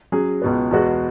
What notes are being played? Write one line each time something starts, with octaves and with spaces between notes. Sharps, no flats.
F#3 C#4 G#4
C#2 B2 B3
E2 B2 G#3 B3 F#4